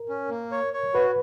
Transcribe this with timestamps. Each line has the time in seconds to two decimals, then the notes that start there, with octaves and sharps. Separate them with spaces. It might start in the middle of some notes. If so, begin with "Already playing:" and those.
Already playing: A#4
0.09 C#4
0.29 A#3
0.51 C#5
0.73 C#5
0.94 F#4 B4